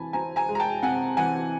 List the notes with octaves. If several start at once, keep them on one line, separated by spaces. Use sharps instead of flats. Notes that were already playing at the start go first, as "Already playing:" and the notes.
Already playing: C3 E3 G#5 A5 B5
C4 G#5 A#5
G#5 A#5
G#3
A#5
G5 A5
C3 F#5 G#5
E3 F#5 G#5